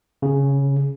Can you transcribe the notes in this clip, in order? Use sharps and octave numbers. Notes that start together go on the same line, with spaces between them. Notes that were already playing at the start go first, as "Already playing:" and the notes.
C#3